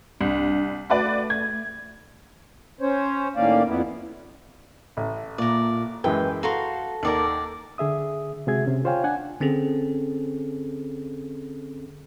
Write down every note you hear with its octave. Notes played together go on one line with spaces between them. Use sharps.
C2 D4
A3 F#4 B4 D5
G#6
C#4 C5 C#5
A2 D#3 A#3 C#4 D5 F5
F2 B3 E4
A1
A#2 A#4 D5
F#2 E3 G#3 B4 G5
F#4 A4 F5 A#5 C6
D#2 A#4 D5 F#5 D6
D3 G#4 E5 D#6
C3 G#3 F#4 G#4 E5 G#6
C3 C#4
F4 C5 C#5 F5 G5 G#5
D4 F#5 G#5
D3 C4 C#4 G#4 A4